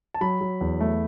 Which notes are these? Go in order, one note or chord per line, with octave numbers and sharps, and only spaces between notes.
A5
F#3 B5
F#3
E2
A3